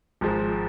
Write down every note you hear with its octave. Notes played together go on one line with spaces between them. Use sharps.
G#1 G#2 F3 G#3